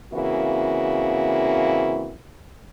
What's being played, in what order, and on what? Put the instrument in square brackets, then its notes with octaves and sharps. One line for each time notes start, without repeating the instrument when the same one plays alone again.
[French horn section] C#3 E3 A#3 C4 E4 F#4